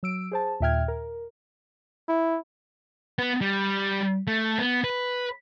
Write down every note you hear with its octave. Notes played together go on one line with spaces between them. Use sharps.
F#3 E6 D7
G#4 C5 A5
D#2 A#2 E5 G5 F6 G#6
A#4
E4
B3
G3
A3
B3
B4